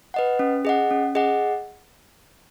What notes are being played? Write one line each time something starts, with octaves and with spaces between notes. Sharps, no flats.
B4 D#5 F#5
C#4
G#4 D#5 F#5
C#4
G#4 D#5 F#5